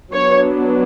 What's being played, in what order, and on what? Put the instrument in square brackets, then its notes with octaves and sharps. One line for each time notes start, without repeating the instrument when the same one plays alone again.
[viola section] F#3 B3 D4 C#5